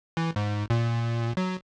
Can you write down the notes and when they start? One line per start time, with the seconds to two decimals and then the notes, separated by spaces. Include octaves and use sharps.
0.17 E3
0.36 G#2
0.70 A#2
1.37 F#3